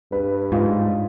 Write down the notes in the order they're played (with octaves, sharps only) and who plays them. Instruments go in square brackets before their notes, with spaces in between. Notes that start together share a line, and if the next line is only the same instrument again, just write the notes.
[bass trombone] G2 [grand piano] B4
[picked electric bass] G#2 [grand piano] F4